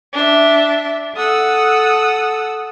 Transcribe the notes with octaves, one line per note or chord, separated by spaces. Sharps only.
D4 E5
A4 F#5 D#6 E6